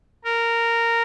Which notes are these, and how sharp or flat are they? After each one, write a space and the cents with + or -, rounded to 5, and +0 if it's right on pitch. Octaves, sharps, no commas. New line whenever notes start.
A#4 -10